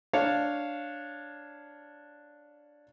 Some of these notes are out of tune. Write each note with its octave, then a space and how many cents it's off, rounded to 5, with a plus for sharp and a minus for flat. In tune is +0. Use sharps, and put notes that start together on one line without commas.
D4 +0 C#5 +0 F5 +0